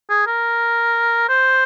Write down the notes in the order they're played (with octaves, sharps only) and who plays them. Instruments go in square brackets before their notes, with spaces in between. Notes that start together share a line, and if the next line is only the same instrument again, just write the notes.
[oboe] G#4
A#4
C5